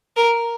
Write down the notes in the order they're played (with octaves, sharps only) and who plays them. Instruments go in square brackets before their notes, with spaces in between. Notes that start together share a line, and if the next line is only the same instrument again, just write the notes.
[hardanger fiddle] A#4